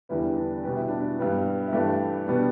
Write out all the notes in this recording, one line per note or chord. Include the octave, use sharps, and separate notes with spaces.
E2 D3 G3 B3 E4
D4
B2 G3 B3 G4
E4
D4
E4
G2 G3 B3
E4
G2 E3 A3 D4 G4
B2 G3 B3 D4